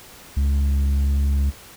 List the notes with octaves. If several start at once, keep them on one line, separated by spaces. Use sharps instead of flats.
C#2